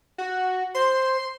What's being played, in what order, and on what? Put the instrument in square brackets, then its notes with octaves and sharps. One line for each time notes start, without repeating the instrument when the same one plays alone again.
[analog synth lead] F#4
[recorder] C5 [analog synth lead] C6